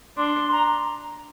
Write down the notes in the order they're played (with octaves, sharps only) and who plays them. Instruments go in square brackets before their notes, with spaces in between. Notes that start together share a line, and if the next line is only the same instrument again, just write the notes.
[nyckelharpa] D4 [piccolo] C6
[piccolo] A#5